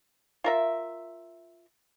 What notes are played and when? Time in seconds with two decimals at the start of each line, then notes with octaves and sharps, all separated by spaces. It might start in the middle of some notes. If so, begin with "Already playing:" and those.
0.44 F4 A#4 E5